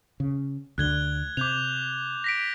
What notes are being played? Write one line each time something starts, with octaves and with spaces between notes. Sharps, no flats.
C#3
D2 D3 F#6 G#6 G7
C3 D6 G6 F7
A#6 B6 D7